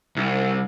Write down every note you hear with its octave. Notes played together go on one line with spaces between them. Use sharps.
C2